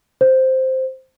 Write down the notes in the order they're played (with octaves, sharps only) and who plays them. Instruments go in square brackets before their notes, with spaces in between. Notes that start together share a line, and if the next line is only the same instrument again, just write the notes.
[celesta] C5